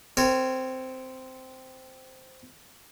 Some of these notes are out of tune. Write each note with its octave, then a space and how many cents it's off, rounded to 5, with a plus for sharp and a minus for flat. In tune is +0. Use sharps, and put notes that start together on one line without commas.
C4 -10 A#4 -40 C#5 +0